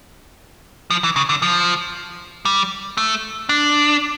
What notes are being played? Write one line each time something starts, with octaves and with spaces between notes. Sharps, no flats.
F3
E3
C#3
D3
F3
G3
A3
D4